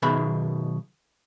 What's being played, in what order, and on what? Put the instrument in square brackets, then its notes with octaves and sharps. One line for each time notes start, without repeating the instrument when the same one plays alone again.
[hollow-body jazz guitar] B1 B2 D#3 G#4 E5 B5